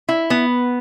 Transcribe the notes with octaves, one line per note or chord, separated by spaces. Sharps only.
E4
B3